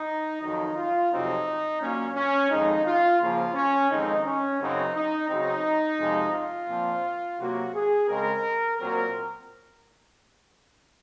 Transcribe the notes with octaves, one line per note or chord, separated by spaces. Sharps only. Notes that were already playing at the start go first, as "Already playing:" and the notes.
Already playing: D#4
F2 D#3 F#3 D#4
F4
F2 C3 F#3 C4 D#4
A#2 F#3 A#3 C#4
C#4
F2 D#3 G#3 D#4
F4
C#3 F3 A#3 F4
C#4
F2 D#3 G#3 C4 D#4
C#4
F#2 C#3 F#3 C4 D#4
D#4
C#3 F#3 C4 D#4
F2 C3 F3 G#3
F4
A#2 F3 C4
C3 F#3 A#3 F#4
G#4
C#3 G#3 C4 A#4
A#2 F#3 C4 A#4